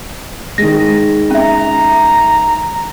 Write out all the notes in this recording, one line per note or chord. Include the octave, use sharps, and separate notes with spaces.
D#3 G#3 A#6
C#4 E5 A#5